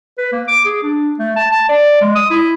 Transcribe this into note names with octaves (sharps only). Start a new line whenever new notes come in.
B4
A#3
D6
G#4
D4
A3
A5
A5
D5
G#3
D#6
E4